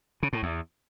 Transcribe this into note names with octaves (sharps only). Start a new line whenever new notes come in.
C#3
A2
E2